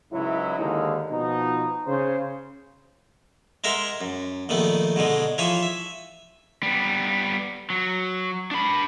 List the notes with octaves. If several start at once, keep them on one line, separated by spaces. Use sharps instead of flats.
C#2 G#2 F#3 E4
D#2 D3 G#3 D#4
B2 F3 D#4
C#3 C5
G#3 A#4 E5 F#5 C6
F#2
A#1 D#3 A3 B3
G#2 B2 D3 G#3
E3 F3 G#4 C#5 E5
E5
G3 B3
F#3
D4 B5